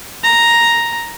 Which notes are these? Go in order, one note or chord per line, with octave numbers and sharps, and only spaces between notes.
A#5